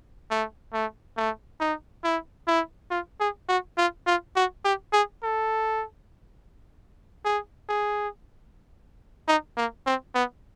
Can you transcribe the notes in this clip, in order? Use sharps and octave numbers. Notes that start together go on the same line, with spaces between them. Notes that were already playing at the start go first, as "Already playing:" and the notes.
A3
A3
A3
D#4
E4
E4
F4
G#4
F#4
F4
F4
F#4
G4
G#4
A4
G#4
G#4
D#4
A#3
C4
B3